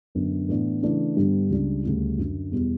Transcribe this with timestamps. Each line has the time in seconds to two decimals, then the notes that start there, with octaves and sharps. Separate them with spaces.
0.15 F#2 D3 F#3 B3
0.49 A2 E3 B3 D4
0.83 C#3 E3 A3 D4
1.16 G2 D3 G3 B3
1.50 C#2 C#3 G3 D4
1.84 D2 C#3 G3
2.18 F#2 D3 F#3
2.51 E2 B2 G3